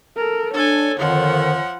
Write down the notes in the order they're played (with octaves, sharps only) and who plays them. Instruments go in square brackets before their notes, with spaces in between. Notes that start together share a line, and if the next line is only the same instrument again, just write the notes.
[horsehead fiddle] A4 A#4
[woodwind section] D4 [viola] A4 G#5 [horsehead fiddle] C#5
[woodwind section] F2 D3 D#3 [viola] F3 F#5